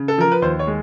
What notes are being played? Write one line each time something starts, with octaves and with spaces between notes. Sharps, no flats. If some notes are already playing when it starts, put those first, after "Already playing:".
Already playing: C#3
A4
F3 A#4
B4
D#2 C5
C#5
G#3